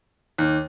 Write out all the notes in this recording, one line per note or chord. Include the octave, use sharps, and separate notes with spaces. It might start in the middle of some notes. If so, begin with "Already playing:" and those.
D#2